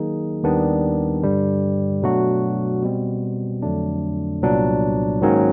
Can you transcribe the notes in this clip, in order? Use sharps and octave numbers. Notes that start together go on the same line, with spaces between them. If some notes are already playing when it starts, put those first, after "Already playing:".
Already playing: D#3 F#3 A#3 D#4 G#4
D#2 D#3 G3 B3 D4
G2 D3 G3
B2 F#3 A3 D4 F#4
B2 G3 C4
F2 D3 F#3 A3 D4
C2 A#2 F#3 B3 D4
G#2 D#3 F#3 A#3 C#4